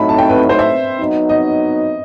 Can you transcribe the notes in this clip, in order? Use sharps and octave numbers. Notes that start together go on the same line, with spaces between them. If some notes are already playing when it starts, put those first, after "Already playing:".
Already playing: A2 F#3 A3 D#4 B5
A5
G5
B4
C5
E5
F#3 B3 D#4
D#5